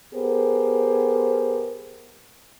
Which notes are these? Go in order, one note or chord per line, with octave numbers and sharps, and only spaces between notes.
B3 G4 G#4 A#4 C5